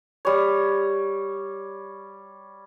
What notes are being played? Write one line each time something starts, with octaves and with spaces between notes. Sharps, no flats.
G3 C#5